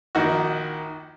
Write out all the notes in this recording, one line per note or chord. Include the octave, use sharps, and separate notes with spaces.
A#1 D#3 F#4